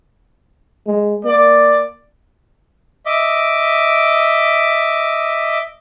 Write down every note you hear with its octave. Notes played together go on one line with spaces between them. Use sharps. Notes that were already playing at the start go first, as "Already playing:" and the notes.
G#3
A#3 D5
D#5 E5 D6